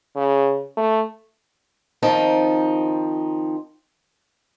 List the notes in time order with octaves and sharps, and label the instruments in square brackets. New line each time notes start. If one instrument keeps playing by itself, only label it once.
[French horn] C#3
A3
[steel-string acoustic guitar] D#3 F3 C4 D#4 G5